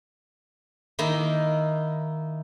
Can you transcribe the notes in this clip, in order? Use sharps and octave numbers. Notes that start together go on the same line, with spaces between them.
D#3 A#3 D#4 E4